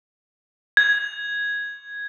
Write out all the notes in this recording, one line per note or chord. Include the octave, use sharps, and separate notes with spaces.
G#6